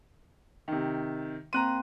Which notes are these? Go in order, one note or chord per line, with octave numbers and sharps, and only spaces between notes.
C3 D#3
A#3 C4 A#5 C6 F#6 D#7